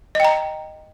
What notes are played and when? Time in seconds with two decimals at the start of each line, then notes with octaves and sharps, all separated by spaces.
0.15 D#5
0.20 G5
0.25 A#5